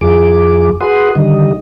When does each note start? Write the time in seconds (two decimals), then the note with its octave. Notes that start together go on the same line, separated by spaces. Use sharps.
0.01 F2 F3 G#4 D6
0.81 F#4 G#4 B4 F#5 C6 D#6
1.15 D3 D#3 G3 D#5